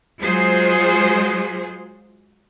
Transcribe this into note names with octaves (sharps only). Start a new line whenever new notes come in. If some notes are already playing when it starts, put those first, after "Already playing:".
F#3 G#3 F4 G#4 C5